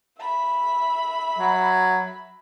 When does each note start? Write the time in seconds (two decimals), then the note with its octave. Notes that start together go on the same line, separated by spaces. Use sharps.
0.18 E5 B5
1.39 F#3